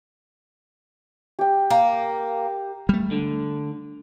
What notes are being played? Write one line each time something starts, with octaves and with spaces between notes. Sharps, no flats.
G4 G5
A#3
G3 A3
D3